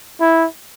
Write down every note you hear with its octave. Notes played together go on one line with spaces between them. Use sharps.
E4